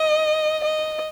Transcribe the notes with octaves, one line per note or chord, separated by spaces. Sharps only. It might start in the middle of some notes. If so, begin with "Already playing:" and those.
Already playing: D#5
D#5